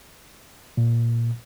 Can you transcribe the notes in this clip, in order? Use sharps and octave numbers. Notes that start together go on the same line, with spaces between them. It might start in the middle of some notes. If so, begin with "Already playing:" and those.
A#2